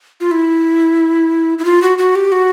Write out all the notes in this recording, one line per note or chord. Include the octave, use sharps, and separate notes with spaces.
F4
E4
E4
F4
F#4
F#4
G4
F#4